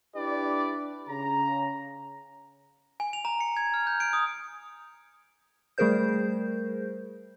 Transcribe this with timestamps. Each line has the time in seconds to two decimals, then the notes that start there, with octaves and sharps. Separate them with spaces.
0.16 D4 E4 G4 B4 D5
1.10 C#3 A#5
3.00 G#5
3.13 F7
3.25 A#5
3.41 C#7
3.57 G#6
3.74 F6
3.87 G6
4.00 D7
4.13 D#6
5.78 G3 A3 G#4 A#4 C5 G6